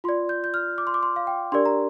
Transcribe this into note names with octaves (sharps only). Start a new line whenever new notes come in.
F4 D5 C6
G6
G6
F6
D6
C6
D6
C6
F5
G5
D4 G4 A#4 D5 C6
A#5